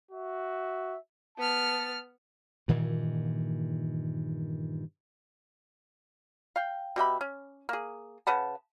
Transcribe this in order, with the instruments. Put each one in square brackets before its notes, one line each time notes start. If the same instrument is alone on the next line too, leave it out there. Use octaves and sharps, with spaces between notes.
[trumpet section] F#4 E5
[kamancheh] B3 F6 [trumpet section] A5
[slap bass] G2 A#2 D#3 E3
[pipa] F5 G5
B2 G4 E5 B5
C#4
A#3 G#4
C#3 B4 F#5 A5